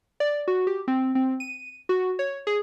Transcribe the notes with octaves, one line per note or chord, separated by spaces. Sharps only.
D5
F#4
G4
C4
C4
D#7
F#4
C#5
G#4